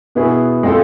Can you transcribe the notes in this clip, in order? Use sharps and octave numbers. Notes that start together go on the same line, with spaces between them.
B2 B3 E4 G#4
G#3 C4 F4 A4